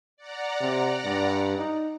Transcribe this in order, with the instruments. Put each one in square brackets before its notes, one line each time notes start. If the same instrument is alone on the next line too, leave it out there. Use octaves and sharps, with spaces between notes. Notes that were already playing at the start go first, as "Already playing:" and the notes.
[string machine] D5 F#5 A#5
[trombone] C3
G2
D#4